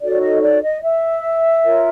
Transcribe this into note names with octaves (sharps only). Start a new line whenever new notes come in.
D#4 F#4 A4 C#5 D5
D#5
D5
D#5
E5
F4 A#4 C#5